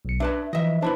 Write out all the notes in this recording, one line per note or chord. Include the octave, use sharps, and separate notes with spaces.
B1 C#7
D4 B4 E5 A5
E3 F3 D#5 E5
D4 E4 B4 C5 A5